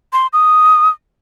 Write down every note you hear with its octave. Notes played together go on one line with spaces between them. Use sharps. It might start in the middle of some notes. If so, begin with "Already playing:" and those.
C6
D#6